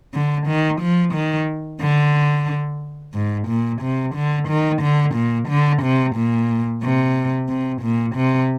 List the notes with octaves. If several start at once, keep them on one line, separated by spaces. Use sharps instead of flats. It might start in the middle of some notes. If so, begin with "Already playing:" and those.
D3
D#3
F3
D#3
D3
G#2
A#2
C3
D3
D#3
D3
A#2
D3
C3
A#2
C3
C3
A#2
C3